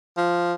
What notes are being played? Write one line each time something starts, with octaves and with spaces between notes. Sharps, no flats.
F3